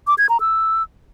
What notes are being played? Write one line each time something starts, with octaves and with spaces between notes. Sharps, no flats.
D6
G#6
A#5
E6